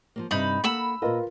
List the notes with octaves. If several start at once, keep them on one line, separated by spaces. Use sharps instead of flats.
F3 F#3 A#3
G2 C3 D#4 B5
A#3 A4 F#5 B5 E6
A#2 F4 A#4 B4 D#5